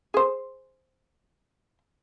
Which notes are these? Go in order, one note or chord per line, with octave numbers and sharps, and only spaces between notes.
G#4 C5